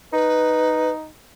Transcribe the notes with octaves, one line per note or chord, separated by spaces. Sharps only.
D#4 B4